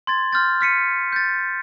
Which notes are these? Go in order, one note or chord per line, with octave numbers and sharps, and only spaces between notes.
C6 G#6 A6
C6 F6 G6 A6
F6 B6 C#7 D#7
G6 A6